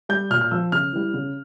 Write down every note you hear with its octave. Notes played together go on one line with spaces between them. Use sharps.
G3 G6
A#2 F6
F6
F3 E6
C#3 F6
E3 G3
C#3